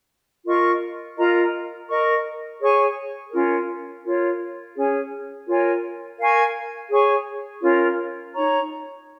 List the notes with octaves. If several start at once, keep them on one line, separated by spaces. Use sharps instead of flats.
F4 A#4 D#5 C#6
F4 A#4 D#5 A#5
A#4 D#5 C#6
G#4 C#5 G#5 C#6
C#4 F4 A#4
F4 A#4 C#5
C#4 G#4 C#5 G#5
F4 A#4 C#5 G#5
A#4 F5 G#5 C#6
G#4 C#5 G#5 C#6
C#4 F4 A#4 C#5
D#4 C#5 A#5 C#6